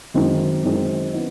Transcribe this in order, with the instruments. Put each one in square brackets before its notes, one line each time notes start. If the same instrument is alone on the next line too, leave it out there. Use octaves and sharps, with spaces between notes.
[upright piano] F#2 D#3 G#3 C4
F#2 D#3 G#3 C4
B3 D#4